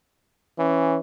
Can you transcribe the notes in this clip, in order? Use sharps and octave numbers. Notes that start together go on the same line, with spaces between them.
E3 C#4